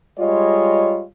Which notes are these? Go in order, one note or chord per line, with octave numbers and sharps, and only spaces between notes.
G3 G#3 F4 C#5 D#5